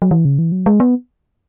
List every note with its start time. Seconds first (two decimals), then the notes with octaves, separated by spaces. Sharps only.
0.02 F#3
0.11 E3
0.25 C#3
0.39 E3
0.52 F#3
0.66 G#3
0.80 B3